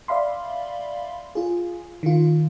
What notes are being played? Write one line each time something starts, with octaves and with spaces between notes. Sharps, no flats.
D5 E5 F5 B5 C6
F4 G#4
D#3 F4